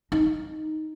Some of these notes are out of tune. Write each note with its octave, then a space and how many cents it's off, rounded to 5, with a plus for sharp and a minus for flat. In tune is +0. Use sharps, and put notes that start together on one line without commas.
D#4 +0